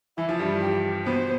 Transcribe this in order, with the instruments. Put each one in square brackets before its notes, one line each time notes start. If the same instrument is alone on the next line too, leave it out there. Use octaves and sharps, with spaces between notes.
[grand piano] E3 [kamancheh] E4
[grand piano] F3
G2 G3
[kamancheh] G4
[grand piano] B2 B3 [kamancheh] C5